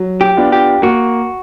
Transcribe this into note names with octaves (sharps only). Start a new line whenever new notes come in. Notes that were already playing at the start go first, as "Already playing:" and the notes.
Already playing: F#3
G4
B3 D4 F4
G4
A#3 F#4